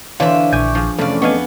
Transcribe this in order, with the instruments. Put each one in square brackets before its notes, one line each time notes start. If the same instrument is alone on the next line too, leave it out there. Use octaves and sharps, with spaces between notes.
[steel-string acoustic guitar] D3 E5 [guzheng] E3 D4 C5 [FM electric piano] C#5 [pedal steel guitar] F5
[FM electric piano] A#1 [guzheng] G#5 [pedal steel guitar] C#6 D6 G6
[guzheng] F3 G#4
[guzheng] F2 [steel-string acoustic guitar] C3 D5 [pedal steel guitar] E3 A3 C#4 [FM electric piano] A4 F5
[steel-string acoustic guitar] B3 [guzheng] D4 F5 G#5 [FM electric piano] D#5 C#6